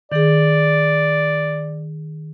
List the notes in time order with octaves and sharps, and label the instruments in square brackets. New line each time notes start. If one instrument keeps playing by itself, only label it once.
[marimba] D#3 G#4 [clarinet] D5